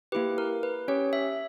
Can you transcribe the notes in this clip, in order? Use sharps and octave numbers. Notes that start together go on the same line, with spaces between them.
A#3 E4 G4 B4
A#4
B4
C#4 G4 C#5
E5